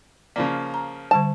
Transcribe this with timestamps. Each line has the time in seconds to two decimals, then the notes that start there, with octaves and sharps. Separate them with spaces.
0.36 C#3 F3 A#3 D5
0.74 A#5
1.11 D3 G3 C5 A5